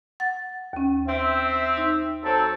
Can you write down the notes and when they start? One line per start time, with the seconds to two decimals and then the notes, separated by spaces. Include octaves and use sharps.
0.20 F#5 A6
0.73 D#2 C#4
1.07 C4 E5
1.77 D#4
2.23 F#3 C4 A4